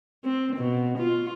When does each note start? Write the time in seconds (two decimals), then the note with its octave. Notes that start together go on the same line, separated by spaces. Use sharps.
0.24 C4
0.56 B2
0.98 F4